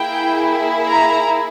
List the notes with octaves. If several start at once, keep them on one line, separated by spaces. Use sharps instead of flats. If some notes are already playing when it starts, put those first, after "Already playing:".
Already playing: A#3 E4 G#4 G5
A#5